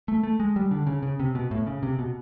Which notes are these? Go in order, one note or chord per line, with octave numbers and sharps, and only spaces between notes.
A3
A3
G#3
G3
D3
C#3
C#3
C3
B2
A2
C#3
C3
B2